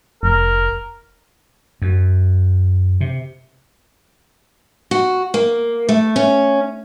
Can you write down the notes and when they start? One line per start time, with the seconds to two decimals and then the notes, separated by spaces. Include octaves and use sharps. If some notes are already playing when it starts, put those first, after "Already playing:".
0.23 F1 A#4
1.82 F#2
3.01 C3
4.91 F#4
5.34 A#3
5.89 A3
6.16 C#4